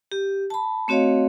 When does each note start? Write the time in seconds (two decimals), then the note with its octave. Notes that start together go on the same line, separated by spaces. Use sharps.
0.12 G4
0.50 A5 B5
0.88 A3 C4 F#4 C#5 D#5 F5